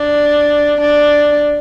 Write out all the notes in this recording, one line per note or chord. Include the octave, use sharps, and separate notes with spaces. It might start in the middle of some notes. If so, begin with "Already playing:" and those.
Already playing: D4
D4